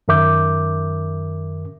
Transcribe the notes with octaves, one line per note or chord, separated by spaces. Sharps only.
F#2 D#3 A#4 E5 D6 G6